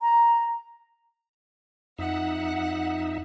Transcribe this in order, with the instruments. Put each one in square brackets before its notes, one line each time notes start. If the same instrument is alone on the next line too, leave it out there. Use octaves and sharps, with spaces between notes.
[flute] A#5
[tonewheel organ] F2 D#4 E5 [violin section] F#5